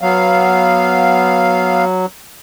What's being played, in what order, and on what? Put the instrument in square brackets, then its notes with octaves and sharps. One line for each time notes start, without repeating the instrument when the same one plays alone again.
[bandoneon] F#3 [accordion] B3 F5